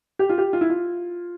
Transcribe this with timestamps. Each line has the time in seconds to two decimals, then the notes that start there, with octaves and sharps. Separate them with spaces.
0.19 G4
0.29 F4
0.38 G4
0.53 F4
0.61 E4
0.70 F4